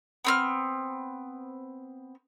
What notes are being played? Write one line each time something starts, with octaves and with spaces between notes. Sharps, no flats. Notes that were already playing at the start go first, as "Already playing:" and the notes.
B3 C4 F6